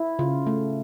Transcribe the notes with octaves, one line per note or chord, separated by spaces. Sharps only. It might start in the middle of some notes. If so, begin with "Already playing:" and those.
Already playing: E4
C#3 F4
A3